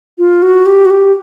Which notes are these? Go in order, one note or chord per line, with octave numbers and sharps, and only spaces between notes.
F4
F#4
G4
F#4
G4